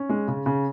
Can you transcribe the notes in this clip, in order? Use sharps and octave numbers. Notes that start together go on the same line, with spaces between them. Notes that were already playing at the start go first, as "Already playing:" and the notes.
Already playing: C#4
G#3
C#3
C#3